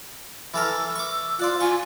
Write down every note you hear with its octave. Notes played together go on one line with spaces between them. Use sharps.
E3 A4 A#4 E6
C#6 D6
F4 C5 D5 F#5
F4 G#5 C#6